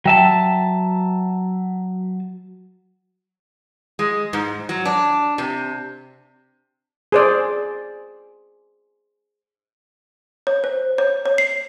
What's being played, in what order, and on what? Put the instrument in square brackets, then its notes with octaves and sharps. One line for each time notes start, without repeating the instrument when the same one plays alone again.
[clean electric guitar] F#3 E5 A5 [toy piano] G5
[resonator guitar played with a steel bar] G#3
G#2
F#3
D4
C3
[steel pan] G#4 C5 D5
[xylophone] C#5
C5
C#5
C#5
C7